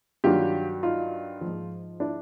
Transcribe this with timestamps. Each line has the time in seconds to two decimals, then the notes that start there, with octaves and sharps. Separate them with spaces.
0.24 G2 D#3 F#3 F4 G4
0.83 D#4 F4
1.41 F3
1.46 G#2
2.00 D4 E4